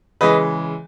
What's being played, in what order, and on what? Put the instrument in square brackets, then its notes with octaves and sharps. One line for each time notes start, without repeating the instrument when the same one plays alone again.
[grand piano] C#3 E3 G#3 B4 D#5